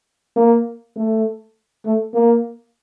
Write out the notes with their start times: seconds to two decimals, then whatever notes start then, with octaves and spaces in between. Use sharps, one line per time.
0.36 A#3
0.96 A3
1.86 A3
2.14 A#3